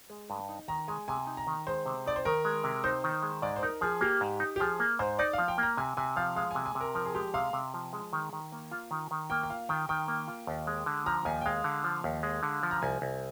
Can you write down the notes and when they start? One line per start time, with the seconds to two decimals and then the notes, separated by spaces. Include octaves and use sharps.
0.10 G#3
0.30 G2
0.49 D#4
0.68 D#3 A#5
0.88 G#3 G#5
1.08 C3 G#5
1.27 D#4
1.37 A#5
1.47 D#3
1.67 G#3 C5
1.86 C3
2.06 D#4 D5
2.16 C5
2.25 D#3 A#4
2.45 G#3
2.64 C3
2.84 D#4 C5
3.04 D#3
3.23 G#3
3.42 G#2 D5
3.56 C5
3.63 D#4 A#4
3.81 F3 G#4
4.01 A#3 G4
4.21 G#2
4.40 D#4
4.56 G4
4.60 F3 G#4
4.80 A#3
4.99 G#2 C5
5.19 D#4 D5
5.33 F3 F5
5.48 G5
5.58 A#3
5.63 A#5
5.77 C3 G#5
5.97 C3 G#5
6.16 F3 F5
6.36 G#3 F5
6.51 C3 G#5
6.66 G#5
6.75 C3
6.80 A#4
6.95 F3 A#4
7.05 G#4
7.15 G#3 G4
7.34 C3 F5
7.53 C3
7.74 F3
7.93 G#3
8.13 D#3
8.33 D#3
8.52 A#3
8.71 F4
8.91 D#3
9.11 D#3
9.30 A#3 G5
9.43 G5
9.50 F4 F5
9.69 D#3 G5
9.89 D#3 G5
10.08 A#3
10.28 F4
10.47 D#2
10.67 G#3
10.86 D3
11.06 F3 A#5
11.25 D#2 G#5
11.41 G5
11.46 G#3 F5
11.64 D3
11.84 F3
12.04 D#2
12.23 G#3
12.43 D3
12.63 F3
12.71 A#5
12.82 C2 G#5
13.02 C2